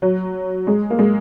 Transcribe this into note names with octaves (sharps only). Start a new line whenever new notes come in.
F#3
G#3
A#3
G#3